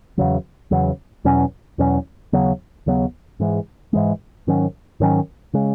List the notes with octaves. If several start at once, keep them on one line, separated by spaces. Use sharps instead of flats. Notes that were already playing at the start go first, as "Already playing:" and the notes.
E2 C#3 F#3
E2 C#3 F#3
E2 B2 F#3 C#4
E2 B2 F#3 C#4
D#2 C#3 F#3 B3
D#2 C#3 F#3 B3
G#2 E3 G#3
G#2 E3 G#3
G#2 D#3 F#3 C#4
G#2 D#3 F#3 C#4
C#3 G#3